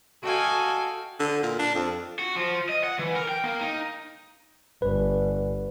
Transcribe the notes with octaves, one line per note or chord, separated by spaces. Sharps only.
F#4 A4 D#5 F5 G5 G#5
D3
A#2
D4
F2
F#4
F3
D#5
F#5
E3
A#4
G5
A#3
D#4
G1 B4